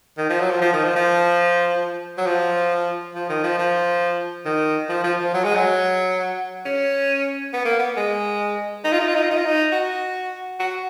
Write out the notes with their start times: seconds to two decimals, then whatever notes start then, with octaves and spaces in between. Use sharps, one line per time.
0.17 D#3
0.30 F3
0.40 F#3
0.50 F3
0.61 F3
0.73 D#3
0.84 F3
0.95 F3
2.18 F#3
2.27 F3
3.15 F3
3.29 D#3
3.44 F3
3.58 F3
4.45 D#3
4.89 F3
5.03 F3
5.19 F3
5.34 F#3
5.44 G#3
5.55 F#3
6.65 C#4
7.53 B3
7.65 A#3
7.79 B3
7.96 G#3
8.84 D#4
8.92 F4
8.99 D#4
9.07 F4
9.15 D#4
9.23 F4
9.31 D#4
9.37 F4
9.45 D#4
9.72 F#4
10.59 F#4